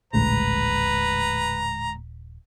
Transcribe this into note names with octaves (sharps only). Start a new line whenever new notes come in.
D#1 A#1 A2 D3 G#3 A3 B4 A#5